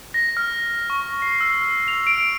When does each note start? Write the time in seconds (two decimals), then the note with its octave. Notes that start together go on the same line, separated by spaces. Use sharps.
0.14 A#6
0.37 F6
0.90 C#6
1.22 C7
1.41 E6
1.88 F7
2.07 D7